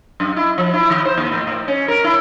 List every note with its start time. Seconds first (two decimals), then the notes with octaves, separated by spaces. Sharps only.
0.20 F#2
0.37 E4
0.58 F3
0.73 E4
0.90 D#3
1.05 C5
1.18 D#2
1.31 A2
1.47 A2
1.68 C#4
1.88 A#4
2.04 E4